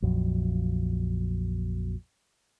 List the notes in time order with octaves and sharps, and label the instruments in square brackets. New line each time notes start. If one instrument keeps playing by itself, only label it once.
[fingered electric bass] A#1 F2 F#3